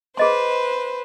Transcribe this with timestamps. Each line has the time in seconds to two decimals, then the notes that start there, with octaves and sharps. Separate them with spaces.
0.17 G#4 B4 C5 D#5 C6